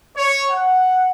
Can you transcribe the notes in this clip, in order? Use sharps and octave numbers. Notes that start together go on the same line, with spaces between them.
C#5
F#5